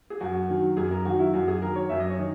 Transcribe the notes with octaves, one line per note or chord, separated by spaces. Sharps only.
G#4
F#2 F#4
D#3 F#3
F#2 G#4
A#4
D#3 F#3 F#4
E4
F#2 F#4
G#4
D#3 F#3 A#4
C#5
F#2 E5
D#5
C#5
D#3